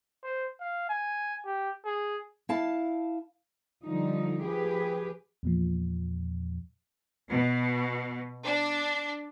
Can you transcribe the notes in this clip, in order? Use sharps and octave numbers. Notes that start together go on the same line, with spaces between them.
C5
F5
G#5
G4
G#4
E4 F5 A5
D3 F3 G3 D#4
F3 G4 G#4 B4
E2 A#2 F3
B2
D4